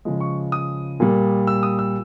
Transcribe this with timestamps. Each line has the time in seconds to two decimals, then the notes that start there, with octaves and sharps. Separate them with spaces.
0.05 C#3 F3 G#3
0.21 C#6
0.52 D#6
1.00 A#2 G3 A#3
1.47 E6
1.63 D#6
1.79 E6